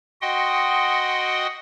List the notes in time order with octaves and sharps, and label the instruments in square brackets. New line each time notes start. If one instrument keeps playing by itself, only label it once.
[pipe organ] F#4 D#5 F#5 G5 C6 D#6